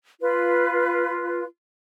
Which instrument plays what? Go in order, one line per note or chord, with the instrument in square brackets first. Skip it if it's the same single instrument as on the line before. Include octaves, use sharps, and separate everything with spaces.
[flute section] F4 B4